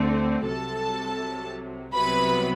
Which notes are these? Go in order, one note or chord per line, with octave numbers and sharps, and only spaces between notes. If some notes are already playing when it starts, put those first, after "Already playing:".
Already playing: D2 D3 A3 C4
C2 C3 F#3 A4 A5
C2 C3 F#3 B3 B4 B5